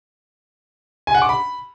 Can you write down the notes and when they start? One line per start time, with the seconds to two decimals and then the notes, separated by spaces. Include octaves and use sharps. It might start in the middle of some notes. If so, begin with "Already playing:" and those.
1.07 G#5
1.14 F#5
1.22 D6
1.29 B5